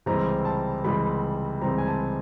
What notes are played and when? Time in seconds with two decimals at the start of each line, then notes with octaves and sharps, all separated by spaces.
0.06 C#2 C3 E3 G3 C4 A#5
0.45 A5
0.84 C#2 C3 E3 G3 C4 B5
1.61 C#2 C3 E3 G3 C4 A#5
1.78 G#5
1.87 A5